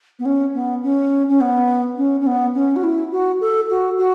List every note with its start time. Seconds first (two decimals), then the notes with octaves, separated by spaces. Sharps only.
0.19 B3
0.25 C#4
0.54 B3
0.83 C#4
1.28 C#4
1.40 B3
1.97 C#4
2.20 C#4
2.26 B3
2.54 C#4
2.76 F#4
2.83 E4
3.11 F#4
3.40 A4
3.69 F#4
3.98 F#4